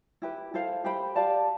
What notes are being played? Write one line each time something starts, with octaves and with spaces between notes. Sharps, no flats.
E4 G4 B4
E4 A4 C5 F5
G4 C5 G5 B5
G4 D5 F5 A5